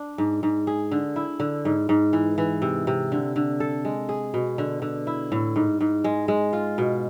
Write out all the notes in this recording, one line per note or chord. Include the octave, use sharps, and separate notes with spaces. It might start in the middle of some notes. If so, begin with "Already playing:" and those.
Already playing: D4
G#2
G#2
G#4
D3
E4
D3
G#2
G#2
E3
E3
C3
C3
D3
D3
A4
G#3
G#4
B2
D3
D3
E4
A2
G#2
G#2
G#3
G#3
F4
B2